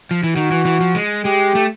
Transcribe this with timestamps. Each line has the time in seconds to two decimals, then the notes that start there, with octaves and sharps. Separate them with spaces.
0.11 F3
0.23 E3
0.36 D#3 F#4
0.51 E3
0.65 E3
0.80 F3
0.95 G#3
1.25 G#3 G4
1.55 A3